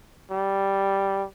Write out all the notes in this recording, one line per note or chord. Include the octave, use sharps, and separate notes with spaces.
G3